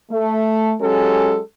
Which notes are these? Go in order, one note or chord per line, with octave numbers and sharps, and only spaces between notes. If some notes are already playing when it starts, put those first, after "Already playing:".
A3
F#3 G#3 C#4 G4 A4